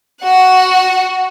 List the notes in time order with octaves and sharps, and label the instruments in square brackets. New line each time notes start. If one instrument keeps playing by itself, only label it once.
[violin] F#4 F#5